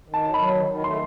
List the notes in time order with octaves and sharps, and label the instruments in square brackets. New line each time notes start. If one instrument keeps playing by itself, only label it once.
[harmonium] D#3
[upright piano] A5
[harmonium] F#3
[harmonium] F#3 [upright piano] B5
[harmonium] D#3
D#3
[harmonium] A3 [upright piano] C6